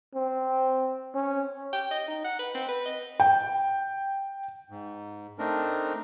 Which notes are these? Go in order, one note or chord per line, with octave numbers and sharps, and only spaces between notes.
C4
C#4
G5
D#5
D#4
F#5
B4
C4
B4
D#5
G5
G#2
A3 C4 D4 D#4 A#4